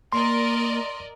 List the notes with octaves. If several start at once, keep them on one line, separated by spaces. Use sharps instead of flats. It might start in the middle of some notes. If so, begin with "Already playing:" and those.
A#3 A#4 D5 D#5 C6